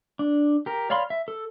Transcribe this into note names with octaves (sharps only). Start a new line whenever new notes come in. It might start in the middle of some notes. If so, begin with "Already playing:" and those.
D4
G4 A#4
C#5 D5 F5 B5 C6
E5
A4